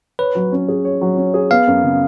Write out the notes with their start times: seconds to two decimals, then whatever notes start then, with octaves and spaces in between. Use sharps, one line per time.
0.19 B4 C#5
0.35 F#3
0.52 C#4
0.68 G#4
0.85 C#5
1.01 F#3
1.17 C#4
1.34 G#4
1.50 B3 F5
1.67 F#2
1.84 C#3